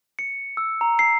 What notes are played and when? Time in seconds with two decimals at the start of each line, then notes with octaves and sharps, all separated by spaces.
0.19 C#7
0.57 E6
0.81 A#5
0.99 C7